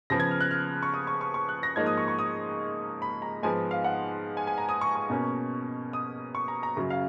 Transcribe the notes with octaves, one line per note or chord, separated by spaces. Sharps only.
C#3 F3 B3 A#6
G#6
F6
F#6
F6
C#6
D#6
C#6
C#6
C#6
F#6
A#6
G#2 F3 A#3 D#4 G#6
D#6
C#6
C#6
D#6
B5
A#5
G#2 F3 B3 G#5
F5
F#5
G#5
G#5
A#5
D#6
C#6
C#6
B2 A#3 C#4
D#6
C#6
A#5
A#5
F#2 C#3 F#3
F5